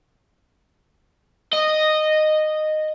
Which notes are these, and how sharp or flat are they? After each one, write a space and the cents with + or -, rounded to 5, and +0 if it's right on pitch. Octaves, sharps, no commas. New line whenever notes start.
D#5 -10